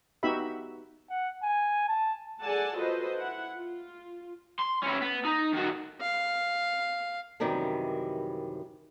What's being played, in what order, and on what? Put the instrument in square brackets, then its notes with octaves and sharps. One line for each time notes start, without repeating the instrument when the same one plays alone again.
[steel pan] B3 D#4 F#4 G4 E5 B5
[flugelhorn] F#5
G#5
A5
[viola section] G#4 A4 D5 F#5 G#5 A5
F4 F#4 A4 B4 C5 D#5
E4 F#5
F4
[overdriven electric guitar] C6
C#4 E4
B3
D#4
D#3 F#4
[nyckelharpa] F5
[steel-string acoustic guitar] F#2 C3 D#3 E3 G3